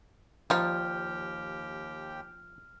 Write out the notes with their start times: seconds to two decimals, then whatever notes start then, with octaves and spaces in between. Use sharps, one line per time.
0.50 D#2 F3 G3 D#4 G4 G5 F6